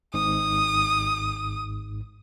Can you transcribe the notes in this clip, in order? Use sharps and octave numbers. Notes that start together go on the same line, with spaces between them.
G#1 G#2 D#6